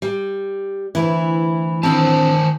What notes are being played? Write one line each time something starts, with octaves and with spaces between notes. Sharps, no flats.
G3
D2 E3 E4
D#3 C4 D4 C5 A5